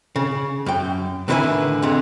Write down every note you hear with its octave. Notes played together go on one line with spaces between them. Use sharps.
C#3
F#2 G5
A2 D3 D#3 E4 B4 G#5
F2 D3 G#3